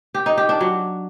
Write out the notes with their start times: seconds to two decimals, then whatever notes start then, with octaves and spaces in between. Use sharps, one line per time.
0.14 G4
0.26 D#4
0.37 G4
0.49 D4
0.60 F#3